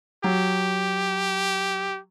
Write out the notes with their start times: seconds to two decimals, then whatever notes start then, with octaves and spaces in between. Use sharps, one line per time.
0.24 F#3 G4